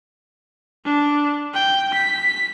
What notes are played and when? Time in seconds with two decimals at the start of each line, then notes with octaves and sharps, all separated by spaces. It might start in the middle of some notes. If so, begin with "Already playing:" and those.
0.85 D4
1.54 G5
1.94 B6